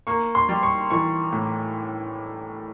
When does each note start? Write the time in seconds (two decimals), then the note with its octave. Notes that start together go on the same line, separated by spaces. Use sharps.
0.07 A#3 C#6
0.35 C6
0.49 G3
0.63 C#6
0.90 E3 C#6
1.33 A2